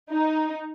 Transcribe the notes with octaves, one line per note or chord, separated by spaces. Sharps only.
D#4